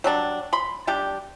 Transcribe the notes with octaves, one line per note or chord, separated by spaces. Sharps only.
F#3 G3 D4
B5 C6
G3 D4 G4